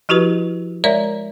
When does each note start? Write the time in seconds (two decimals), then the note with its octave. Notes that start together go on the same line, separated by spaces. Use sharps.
0.09 F3 E4 F#4 G4 B4
0.84 G#3 A#4 C#5 D5 E5 A#5